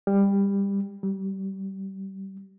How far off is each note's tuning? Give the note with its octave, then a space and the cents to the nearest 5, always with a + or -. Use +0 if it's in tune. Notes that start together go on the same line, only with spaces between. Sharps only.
G3 +20
G3 -25